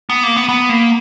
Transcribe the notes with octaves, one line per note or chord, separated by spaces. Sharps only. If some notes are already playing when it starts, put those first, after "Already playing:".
B3
A#3
B3
B3
A#3